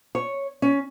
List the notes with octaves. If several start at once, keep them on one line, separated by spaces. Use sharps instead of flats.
C#5
C#4